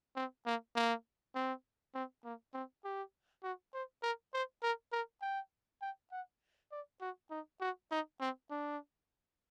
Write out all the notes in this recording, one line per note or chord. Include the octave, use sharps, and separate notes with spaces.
C4
A#3
A#3
C4
C4
A#3
C4
G4
F#4
C5
A#4
C5
A#4
A#4
G5
G5
F#5
D5
F#4
D#4
F#4
D#4
C4
D4